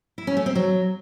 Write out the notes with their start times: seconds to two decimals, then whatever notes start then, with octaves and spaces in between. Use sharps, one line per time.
0.18 E4
0.27 C#4
0.37 A3
0.46 C4
0.55 F#3